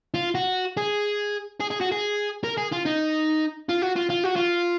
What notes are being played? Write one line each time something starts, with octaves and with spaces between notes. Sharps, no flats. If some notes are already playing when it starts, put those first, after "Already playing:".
F4
F#4
G#4
G#4
G#4
F#4
G#4
A#4
G#4
F4
D#4
F4
F#4
F4
F4
F#4
F4